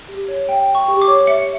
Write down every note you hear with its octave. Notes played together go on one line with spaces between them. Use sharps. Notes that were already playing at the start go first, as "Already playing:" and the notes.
G4
C#5
E5 G5
G5
C#6
G4
D6
C#5
E5 C#7